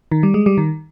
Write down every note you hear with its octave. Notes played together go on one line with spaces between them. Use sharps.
D#3
G3
G#3
G3
D#3